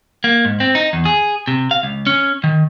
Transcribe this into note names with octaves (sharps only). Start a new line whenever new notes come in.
A#3
G#2
C4
D#4
E2
G#4
C3
F5
C#2
C#4
D#3